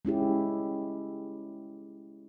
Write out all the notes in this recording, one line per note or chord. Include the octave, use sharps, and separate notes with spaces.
G#3 C#4 E4 G4